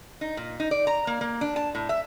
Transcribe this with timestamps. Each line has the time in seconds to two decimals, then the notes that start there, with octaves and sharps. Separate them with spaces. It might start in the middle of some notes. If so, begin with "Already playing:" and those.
0.21 D#4
0.37 A#2
0.60 D#4
0.71 D5
0.87 A#5
1.07 A#3
1.21 A#3
1.41 D4
1.56 A5
1.75 A2
1.89 E5